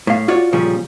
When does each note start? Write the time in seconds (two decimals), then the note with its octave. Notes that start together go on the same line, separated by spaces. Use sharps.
0.07 A2 F5
0.28 F4 F#4 C#5 D5
0.52 A#2 C#3 F3 G3 C#4